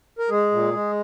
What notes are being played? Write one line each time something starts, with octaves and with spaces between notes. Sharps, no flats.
A#4
G#3 G#4
A#2
G#3